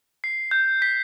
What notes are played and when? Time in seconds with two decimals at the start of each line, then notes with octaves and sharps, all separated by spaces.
0.24 C7
0.51 G6
0.82 B6